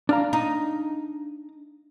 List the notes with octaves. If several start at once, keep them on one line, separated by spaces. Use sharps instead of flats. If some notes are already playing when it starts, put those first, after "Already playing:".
D4 F5 A#5
D#4